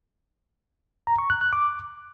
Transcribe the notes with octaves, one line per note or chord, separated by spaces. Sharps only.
A#5
C#6
F#6
F#6
D6